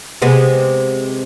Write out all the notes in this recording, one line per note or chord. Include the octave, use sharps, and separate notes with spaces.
C3 G#3 B3